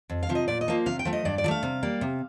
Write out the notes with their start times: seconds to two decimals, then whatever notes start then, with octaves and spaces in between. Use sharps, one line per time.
0.10 F2
0.23 F5
0.29 C3 F3
0.35 D#5
0.48 A#2 D5
0.61 D#5
0.68 F3 A#3
0.86 C3 F5
0.99 G5
1.05 F3 A3
1.13 D#5
1.25 G2 D5
1.38 D5
1.44 F3
1.48 A3 F5
1.63 C3
1.83 G3 A#3
2.01 C3